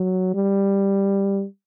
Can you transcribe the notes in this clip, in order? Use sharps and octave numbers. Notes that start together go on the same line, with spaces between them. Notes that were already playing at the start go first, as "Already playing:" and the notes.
Already playing: F#3
G3